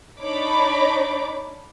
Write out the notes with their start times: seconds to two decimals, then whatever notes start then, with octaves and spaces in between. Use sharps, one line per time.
0.20 D4 D#4 C#5 B5 D6